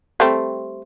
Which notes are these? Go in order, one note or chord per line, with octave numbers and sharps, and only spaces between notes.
G3 A3 C4